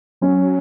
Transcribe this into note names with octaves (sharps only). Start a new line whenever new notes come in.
F#3 C#4